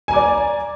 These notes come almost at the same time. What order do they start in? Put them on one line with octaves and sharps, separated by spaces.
G#5 A#5 D6 D5